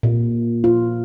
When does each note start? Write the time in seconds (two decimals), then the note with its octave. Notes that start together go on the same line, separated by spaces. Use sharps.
0.03 A#2
0.64 F4